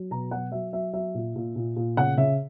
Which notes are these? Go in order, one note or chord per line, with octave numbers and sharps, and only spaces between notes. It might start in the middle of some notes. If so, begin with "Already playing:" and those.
Already playing: F#3
B2 A#5
F#3 F#5
F#3 E5
F#3 E5
F#3 E5
A#2
A#2
A#2
A#2
C#3 F#5
C#3 E5